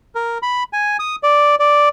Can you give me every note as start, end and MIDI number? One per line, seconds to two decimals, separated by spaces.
0.15 0.38 70
0.42 0.63 83
0.73 0.97 80
0.99 1.16 87
1.23 1.55 74
1.59 1.89 74